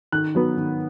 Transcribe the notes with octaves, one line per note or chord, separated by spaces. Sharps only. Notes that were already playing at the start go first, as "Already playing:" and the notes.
D#3 F#6
F#3 B3
D#3